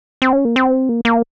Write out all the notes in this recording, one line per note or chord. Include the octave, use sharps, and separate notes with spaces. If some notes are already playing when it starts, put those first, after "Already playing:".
C4
C#4
A#3
C4
A#3
A#3